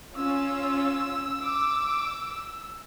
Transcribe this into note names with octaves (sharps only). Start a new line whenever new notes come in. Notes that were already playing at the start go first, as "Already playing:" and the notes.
C#4 F4 C#5 E6
D6